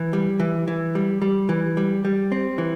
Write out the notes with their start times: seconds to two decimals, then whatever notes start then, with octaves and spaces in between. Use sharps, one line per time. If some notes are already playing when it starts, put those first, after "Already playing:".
Already playing: E3
0.13 G3
0.40 E3
0.68 E3
0.95 G3
1.22 G3
1.49 E3
1.77 G3
2.05 G3
2.32 C4
2.58 E3